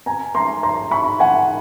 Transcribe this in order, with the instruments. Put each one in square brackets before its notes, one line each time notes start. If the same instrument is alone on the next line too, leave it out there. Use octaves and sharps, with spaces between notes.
[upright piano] G#5 A#5
A#5 C6
A#5 C6
B5 C#6
F#5 G#5